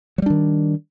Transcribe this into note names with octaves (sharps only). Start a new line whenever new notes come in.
D#3 F#3 G3 D4